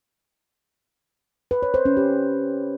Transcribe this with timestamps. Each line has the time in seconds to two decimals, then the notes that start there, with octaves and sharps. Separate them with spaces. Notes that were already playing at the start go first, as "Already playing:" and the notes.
1.51 B4
1.62 C#5
1.74 C5
1.85 C#4
1.97 G4